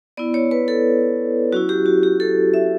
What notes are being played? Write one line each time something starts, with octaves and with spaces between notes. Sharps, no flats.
B3 E4 D5
C#5
B4
A4
F#3 C#4 E4 F#4
G4
F#4
G4
A4
E5